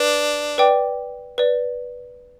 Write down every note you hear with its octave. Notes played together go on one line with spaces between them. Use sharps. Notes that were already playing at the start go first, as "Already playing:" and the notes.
Already playing: D4 B4
B4 D5 G5 D6
B4 D5